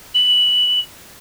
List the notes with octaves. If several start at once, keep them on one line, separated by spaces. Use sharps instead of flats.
F#7